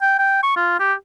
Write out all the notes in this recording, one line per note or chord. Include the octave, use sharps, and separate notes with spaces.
G5
G5
C#6
F4
G4